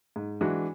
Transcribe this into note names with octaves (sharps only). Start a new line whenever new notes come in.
G#2
E3 G#3 D4 F#4